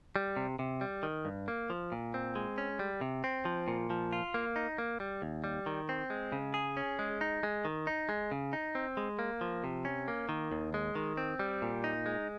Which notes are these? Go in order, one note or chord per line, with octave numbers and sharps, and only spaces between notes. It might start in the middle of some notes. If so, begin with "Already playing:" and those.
G3
C3
C3
G3
D#3
G2
A#3
F3
A#2
C4
G#3
C#4
G3
C3
C4
F3
A#2
F3
F4
A#3
D#4
A#3
G3
D#2
G3
D#3
C4
G#3
C#3
G#4
C#4
G#3
D#4
G#3
D#3
D#4
G#3
C#3
D#4
C4
G#3
A#3
F3
C3
C#4
A#3
D#3
D#2
G#3
D#3
C4
G3
A#2
D#4
G#3